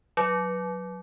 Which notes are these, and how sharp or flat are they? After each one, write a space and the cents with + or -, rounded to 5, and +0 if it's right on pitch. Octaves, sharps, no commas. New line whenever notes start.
F#3 -10